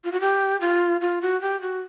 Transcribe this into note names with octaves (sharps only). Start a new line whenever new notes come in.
F4
F#4
G4
F4
F4
F#4
G4
F#4